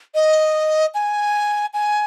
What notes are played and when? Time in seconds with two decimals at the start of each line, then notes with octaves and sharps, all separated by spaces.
0.15 D#5
0.94 G#5
1.74 G#5